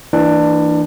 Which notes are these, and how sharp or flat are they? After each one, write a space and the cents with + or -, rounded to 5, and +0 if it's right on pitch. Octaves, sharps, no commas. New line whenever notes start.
E3 +0 A#3 -25 D4 +20